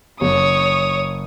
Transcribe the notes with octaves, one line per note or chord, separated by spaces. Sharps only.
F#1 C#5 D#6